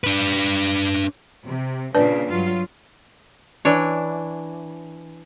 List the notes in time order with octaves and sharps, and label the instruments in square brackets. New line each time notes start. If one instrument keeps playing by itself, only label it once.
[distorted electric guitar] D4 B4
[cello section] C3
[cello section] A#2 C#3 [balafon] D4 B4 D5
[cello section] G2 F#3 F4
[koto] E3 D4 C#5